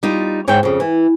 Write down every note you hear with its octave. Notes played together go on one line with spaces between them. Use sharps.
G3 D#4 F4
G#2 C#5 E5 F#5 G5
F2 C#3
E3